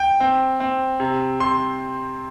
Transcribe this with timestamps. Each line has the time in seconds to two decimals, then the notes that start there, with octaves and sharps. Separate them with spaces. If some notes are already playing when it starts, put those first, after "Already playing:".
Already playing: G5
0.20 C4
0.60 C4
1.00 C3
1.40 C3 C6